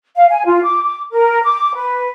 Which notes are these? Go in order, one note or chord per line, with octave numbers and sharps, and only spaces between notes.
F5
G#5
F4
D6
D6
A#4
D6
B4